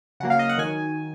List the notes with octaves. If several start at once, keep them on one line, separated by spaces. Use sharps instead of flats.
C#3 F#3 A#3 F#5
F5
D#5
F#5
D#3 F#3 G#5